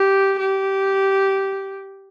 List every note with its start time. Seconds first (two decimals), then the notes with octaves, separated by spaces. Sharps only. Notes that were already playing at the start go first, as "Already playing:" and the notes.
Already playing: G4
0.39 G4